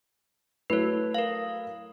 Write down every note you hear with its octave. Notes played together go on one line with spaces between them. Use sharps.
F#3 A3 E4 B4 C#5
A#4 F5